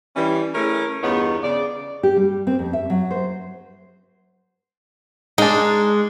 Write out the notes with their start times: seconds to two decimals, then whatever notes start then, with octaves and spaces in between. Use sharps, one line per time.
0.16 E3 G3 C#4
0.55 A3 C#4 E4 G#4 A#4
1.03 E2 G2 B3 D#4 F4 C#5
1.44 C#3 D5
2.03 G4
2.17 G3
2.47 C4
2.59 F2
2.73 E5
2.90 F#3
3.11 C5
5.38 G#3 D4 D#4